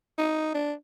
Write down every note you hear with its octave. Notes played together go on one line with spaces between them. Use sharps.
D#4
D4